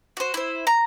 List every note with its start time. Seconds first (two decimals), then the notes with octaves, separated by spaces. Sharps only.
0.17 F#4 C5
0.34 E4 C5
0.67 A#5